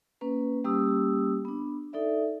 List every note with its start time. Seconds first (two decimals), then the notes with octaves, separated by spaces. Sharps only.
0.21 A#3 C#4 B4
0.64 G3 A#3 C#4 G4 D#6 E6
1.45 B3 D4
1.93 D#4 A4 D5 E5